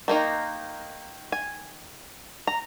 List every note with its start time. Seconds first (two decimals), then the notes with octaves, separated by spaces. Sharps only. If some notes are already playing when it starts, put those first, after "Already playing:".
0.08 D#3 A#3 D#4
1.32 G#5
2.47 A#5